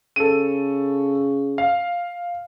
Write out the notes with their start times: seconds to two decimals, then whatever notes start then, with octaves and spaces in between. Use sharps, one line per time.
0.16 C#3 A4 D#7
1.58 F5